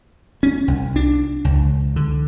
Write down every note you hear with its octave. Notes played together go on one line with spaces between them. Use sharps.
C#4
C2
D4
C#2
D3